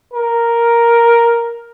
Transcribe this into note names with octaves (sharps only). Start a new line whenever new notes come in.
A#4